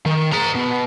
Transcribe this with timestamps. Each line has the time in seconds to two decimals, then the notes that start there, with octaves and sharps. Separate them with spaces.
0.06 D#3
0.32 G#4 A#5
0.55 B2